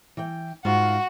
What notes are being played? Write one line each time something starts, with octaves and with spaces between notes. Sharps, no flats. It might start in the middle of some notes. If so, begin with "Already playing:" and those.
E3 G5
G#2 F4 F#4 F5